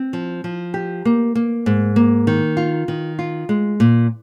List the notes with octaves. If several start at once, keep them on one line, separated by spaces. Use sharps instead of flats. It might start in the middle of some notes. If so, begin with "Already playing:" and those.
Already playing: C4
F3
F3
G4
A#3
A#3
G#2
A#3
D#3
F4
D#3
F4
G#3
A#2